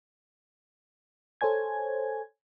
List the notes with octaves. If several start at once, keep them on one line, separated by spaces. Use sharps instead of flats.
A4 C5 C#5 G#5 G#6